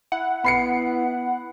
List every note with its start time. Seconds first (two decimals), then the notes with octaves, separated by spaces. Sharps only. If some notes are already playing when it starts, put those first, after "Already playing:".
0.12 E4 F#5
0.45 B3 B5 C7 C#7